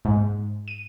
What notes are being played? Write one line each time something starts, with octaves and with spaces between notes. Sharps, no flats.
G#2
D#7